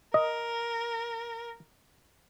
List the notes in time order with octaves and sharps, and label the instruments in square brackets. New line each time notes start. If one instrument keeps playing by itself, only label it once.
[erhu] A#4 [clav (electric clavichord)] D#5